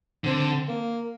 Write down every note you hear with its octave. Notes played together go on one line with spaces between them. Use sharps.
D3 C4
A#3